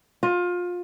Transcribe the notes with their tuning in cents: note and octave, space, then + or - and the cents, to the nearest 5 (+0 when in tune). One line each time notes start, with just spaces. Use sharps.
F4 +25